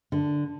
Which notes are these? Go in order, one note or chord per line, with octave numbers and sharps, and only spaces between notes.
D3